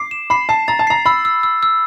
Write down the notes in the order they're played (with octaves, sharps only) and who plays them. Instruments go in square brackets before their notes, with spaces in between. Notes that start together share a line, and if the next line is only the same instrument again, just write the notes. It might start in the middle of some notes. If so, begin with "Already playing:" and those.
Already playing: [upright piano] D6 [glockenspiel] C7
[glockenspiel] E7
[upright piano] B5 [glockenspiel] C7
[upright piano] A5 [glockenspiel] C7
[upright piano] A#5 [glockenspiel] A6
[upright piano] A5
[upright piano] A#5 [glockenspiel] C7
[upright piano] B5 [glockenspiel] E6
[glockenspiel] E6
E6
E6